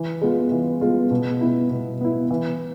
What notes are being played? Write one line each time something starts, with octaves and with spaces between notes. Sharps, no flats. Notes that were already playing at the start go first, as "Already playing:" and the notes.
Already playing: E3
G#3 B3 F4
E3
G#3 B3 F4
B2
B3 E4
B2
B3 E4
E3